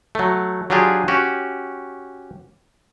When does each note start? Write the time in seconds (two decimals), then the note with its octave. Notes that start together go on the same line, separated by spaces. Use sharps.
0.15 F#3 A3
0.70 F#3 D4 F4 G4 G#4
1.08 C#4 F#4 G4